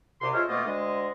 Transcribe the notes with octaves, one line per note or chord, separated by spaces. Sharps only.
C2 C3 C6
G#3 A3 F4 C5 C#5 F5
F2 B2 A3 A#3 F4 D#5
D2 G#3 D#5